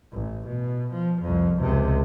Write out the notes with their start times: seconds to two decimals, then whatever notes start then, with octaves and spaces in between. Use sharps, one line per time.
0.13 A1
0.47 B2
0.92 F3
1.22 C2 F2
1.61 C#2 C3